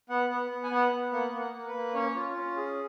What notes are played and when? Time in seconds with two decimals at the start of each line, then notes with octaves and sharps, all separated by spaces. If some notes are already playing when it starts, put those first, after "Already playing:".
0.10 B3 F#5
0.30 B3 F#5
0.51 B3
0.64 G#5
0.71 B3 F#5
0.92 B3
1.12 A#3 F#5
1.33 A#3
1.40 F#5
1.54 A#3
1.68 B4
1.74 A#3
1.94 C#4 C#5
2.15 F4
2.36 C#4
2.56 G#4